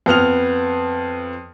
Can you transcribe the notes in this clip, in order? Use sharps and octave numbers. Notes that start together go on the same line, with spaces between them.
F2 B3 F6 F7